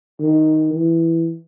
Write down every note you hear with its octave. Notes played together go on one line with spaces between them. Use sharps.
D#3
E3